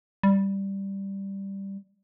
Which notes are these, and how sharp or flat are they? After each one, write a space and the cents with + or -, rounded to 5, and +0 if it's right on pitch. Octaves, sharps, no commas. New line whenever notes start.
G3 +0